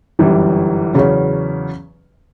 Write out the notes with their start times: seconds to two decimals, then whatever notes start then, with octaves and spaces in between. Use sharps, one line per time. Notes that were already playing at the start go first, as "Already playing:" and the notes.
0.19 G1 F#2 E3 G3
0.94 E2 C#3 F#3 C#4